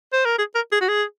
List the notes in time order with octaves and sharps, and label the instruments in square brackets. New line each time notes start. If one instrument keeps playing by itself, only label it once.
[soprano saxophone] C5
A#4
G#4
A#4
G#4
F#4
G#4